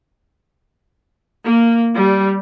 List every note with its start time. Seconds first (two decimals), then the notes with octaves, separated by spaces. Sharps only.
1.44 A#3
1.94 G3